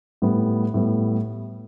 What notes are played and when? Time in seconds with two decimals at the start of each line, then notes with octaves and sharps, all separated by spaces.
0.22 A2 G3 B3
0.74 A2 G3 B3